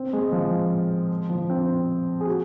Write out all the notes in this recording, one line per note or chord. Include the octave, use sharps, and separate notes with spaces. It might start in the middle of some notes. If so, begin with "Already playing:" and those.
Already playing: C4
G#3
F3
F3
C4
G#4
F#4